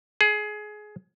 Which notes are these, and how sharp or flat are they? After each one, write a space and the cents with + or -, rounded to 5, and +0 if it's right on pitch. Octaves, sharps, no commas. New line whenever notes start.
G#4 +20